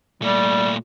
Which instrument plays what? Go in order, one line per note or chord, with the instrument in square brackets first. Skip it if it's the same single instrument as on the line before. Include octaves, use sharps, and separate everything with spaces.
[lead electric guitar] A#2 A3 [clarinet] G3